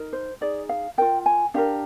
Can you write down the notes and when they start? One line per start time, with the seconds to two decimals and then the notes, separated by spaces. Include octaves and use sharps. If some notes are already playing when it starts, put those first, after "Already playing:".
Already playing: D#4 A#4
0.13 C5
0.41 D#4 G#4 D5
0.69 F5
0.98 F4 A#4 G5
1.26 G#5
1.54 D4 G4 A#4 F5